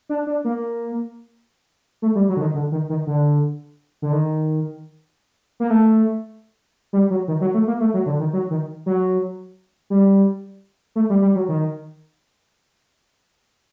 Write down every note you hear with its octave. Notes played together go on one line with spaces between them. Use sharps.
D4
D4
A#3
A3
G3
F#3
D3
D#3
D3
D#3
D#3
D3
D3
D#3
A#3
A3
G3
F#3
D#3
F#3
A3
A#3
A3
F#3
D3
D#3
F#3
D#3
F#3
G3
A3
G3
G3
F#3
D#3